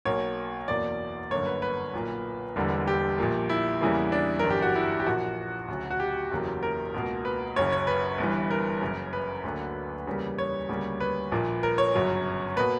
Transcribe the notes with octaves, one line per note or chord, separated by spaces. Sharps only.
B1 B2 A#3 C#5
F#1 E2 B2 A#3 D5
G1 F#2 D3 A#3 C#5
B4
B4
B1 A#2 A#3
E1 E2 D3 G3 A#3
G4
A#1 A#2 A#3
E4
E2 C#3 E3 G3 A#3
D4
G1 F#2 E3 A#4
G4
F#4
E4
G4
A#1 A#2 A#3 F#4
D2 C#3 F#3
F#4
G4
F#1 E2 C#3 F#3 A#3
A#4
C#2 B2 A#3
B4
F#1 F#2 C#3 C#5
C#5
B4
G1 G2 E3
A#4
F#1 F#2 C#3
B4
D2 D3 F#3 A#3
E2 C#3 G3 A#3
C#5
D2 C#3 G3 A#3
B4
A#1 A#2 A#3
A#4
C#5
G1 F#2 C#3 F#3
B2 A#3 B4